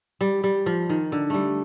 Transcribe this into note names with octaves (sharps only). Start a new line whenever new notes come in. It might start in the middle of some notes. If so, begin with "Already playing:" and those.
G3
G3
F3
D#3
D3
G3 A3